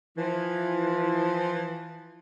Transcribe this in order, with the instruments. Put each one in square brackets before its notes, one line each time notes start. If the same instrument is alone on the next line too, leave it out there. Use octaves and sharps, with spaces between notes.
[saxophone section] E3 F3